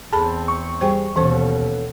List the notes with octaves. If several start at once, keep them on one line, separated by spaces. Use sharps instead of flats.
E2 C4 G#4 A4 A5 B5
C#6
G3 G#4 C5 G5
D#2 B2 E3 B3 C#4 A4 C5